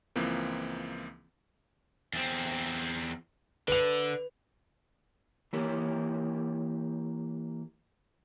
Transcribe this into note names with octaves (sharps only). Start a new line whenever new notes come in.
C#2 E3 F3 A#3 C4
E2 C4
D3 B4 F7
E3 A#3 G4 A#4 C#5